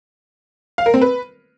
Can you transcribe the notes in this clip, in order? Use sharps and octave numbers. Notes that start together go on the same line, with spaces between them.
F5
A#4
C4
B4